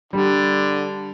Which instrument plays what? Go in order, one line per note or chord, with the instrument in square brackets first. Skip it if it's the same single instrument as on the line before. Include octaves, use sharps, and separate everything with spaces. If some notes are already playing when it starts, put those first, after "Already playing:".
[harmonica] D3 [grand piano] G3